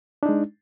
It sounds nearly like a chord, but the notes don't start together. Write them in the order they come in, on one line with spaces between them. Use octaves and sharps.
D4 D#4 G#3